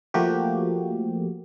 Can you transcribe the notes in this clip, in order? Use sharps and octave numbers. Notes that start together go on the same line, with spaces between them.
F3 A3 A#3 F#4 G4